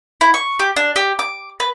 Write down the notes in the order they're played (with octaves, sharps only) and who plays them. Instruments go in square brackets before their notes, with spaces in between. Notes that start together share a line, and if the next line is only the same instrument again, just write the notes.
[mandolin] E4
C#6
G4
D4
G4
D6
B4